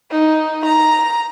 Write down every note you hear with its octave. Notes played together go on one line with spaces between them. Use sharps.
D#4
A#5